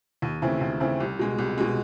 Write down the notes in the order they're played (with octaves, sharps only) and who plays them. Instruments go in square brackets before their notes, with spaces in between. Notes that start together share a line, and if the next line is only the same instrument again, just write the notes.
[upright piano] D#2
C#3 E3 A3 C4
D#2
C#3 E3 A3 C4
C2
B2 G#3
C2
B2 G#3